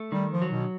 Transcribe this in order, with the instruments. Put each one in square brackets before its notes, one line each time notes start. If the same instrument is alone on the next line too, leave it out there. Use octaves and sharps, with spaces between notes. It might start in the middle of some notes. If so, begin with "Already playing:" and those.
Already playing: [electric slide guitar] A3
[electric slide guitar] D#3 [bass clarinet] G3
[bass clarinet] F3
[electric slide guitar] F#3
[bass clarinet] B2